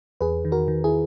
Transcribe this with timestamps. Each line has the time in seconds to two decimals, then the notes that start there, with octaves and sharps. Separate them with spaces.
0.21 E2 G#4 B4
0.45 D#3
0.52 F#4 A#4
0.68 D#3
0.84 E4 G#4